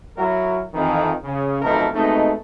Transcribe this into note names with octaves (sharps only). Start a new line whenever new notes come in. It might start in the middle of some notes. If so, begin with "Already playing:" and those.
F#3 E4 F#4 A#4
F2 D#3 E3
C#3
B1 F2 B2 D#3 A3 A#4
B2 G#3 A3 C4 D#4